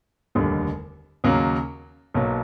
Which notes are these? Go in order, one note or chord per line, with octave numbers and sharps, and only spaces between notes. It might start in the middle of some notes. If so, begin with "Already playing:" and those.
F1 D#2 D3 G3
D#2 C#3 F#3 A#3
B1 B2 F#3 A#3